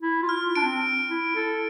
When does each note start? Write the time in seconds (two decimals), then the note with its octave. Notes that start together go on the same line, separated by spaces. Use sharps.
0.02 E4
0.23 F4
0.29 F6
0.55 D4 D7
0.63 C4
1.10 E4
1.36 A4